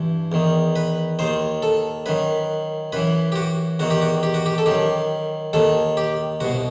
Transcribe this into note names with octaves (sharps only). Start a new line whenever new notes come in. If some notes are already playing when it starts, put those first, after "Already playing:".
Already playing: G2 E3
E2 D#3
B4
D#2 D#3 C5
A4
F#2 D#3 B4
F#2 E3 B4
G4
F#4
E2 D#3 F#4
G4
F#4
G4
F#4
G4
A4
F#2 D#3 G4
D#2 D#3 A4
G4
C2 B2 F#4